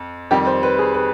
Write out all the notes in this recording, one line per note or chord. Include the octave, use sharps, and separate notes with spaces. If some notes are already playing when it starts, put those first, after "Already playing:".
Already playing: F2
F2 D#3 G3 G4
C5
B4
G#4
B4